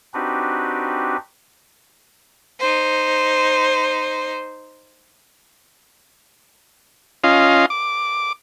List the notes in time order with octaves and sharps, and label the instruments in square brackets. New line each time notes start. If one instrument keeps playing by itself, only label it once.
[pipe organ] C4 D4 D#4 F#4 G4 B4
[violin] D#4 C5
[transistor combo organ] C#4 F4 D#5 F5
D6